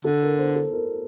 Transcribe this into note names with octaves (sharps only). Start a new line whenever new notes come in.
D3 A4
A#4
C5
A4
A#4